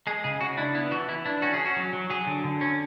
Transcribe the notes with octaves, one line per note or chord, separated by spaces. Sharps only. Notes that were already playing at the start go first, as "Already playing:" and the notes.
G#3 G#4
C#3 G#4
C#3 F#4
D4 E4
B3 E4
E3 F#4
E3 E4
D4 E4
C#4 F#4
G#4
C#4
F#4
F#3
F#3
F#3 G#4
D3
D3
C#4